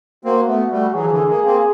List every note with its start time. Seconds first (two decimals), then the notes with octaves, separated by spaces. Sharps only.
0.25 A#3 C4 F#4
0.48 A3 B3
0.71 G3 A3
0.93 E3 F#3 G#4
1.04 F3
1.11 D3 E3
1.28 G#3 A#3
1.45 A#3 C4